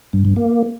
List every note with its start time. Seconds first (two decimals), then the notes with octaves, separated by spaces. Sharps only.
0.13 G2
0.25 G2
0.36 A#3